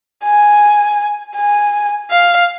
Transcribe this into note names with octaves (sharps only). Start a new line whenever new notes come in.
G#5
G#5
F5